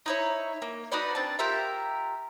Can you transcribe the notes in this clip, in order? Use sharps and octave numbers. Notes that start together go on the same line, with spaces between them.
D#4 E4 C#5
A#3
D#4 F#4 B4 D5
C4 D4 A5
F4 G4 A#4 E5